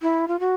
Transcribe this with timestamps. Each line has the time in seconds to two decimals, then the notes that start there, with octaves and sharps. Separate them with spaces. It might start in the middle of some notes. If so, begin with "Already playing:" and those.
0.02 E4
0.28 F4
0.40 F#4